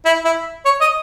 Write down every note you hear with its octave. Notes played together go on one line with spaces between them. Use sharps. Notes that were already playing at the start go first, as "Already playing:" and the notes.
E4
E4
C#5
D#5